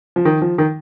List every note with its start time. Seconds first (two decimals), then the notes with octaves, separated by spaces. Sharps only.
0.16 F3
0.25 D#3
0.42 F3
0.58 D#3